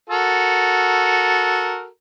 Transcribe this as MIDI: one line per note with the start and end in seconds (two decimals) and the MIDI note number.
0.10 1.87 66
0.10 1.87 69
0.10 1.87 70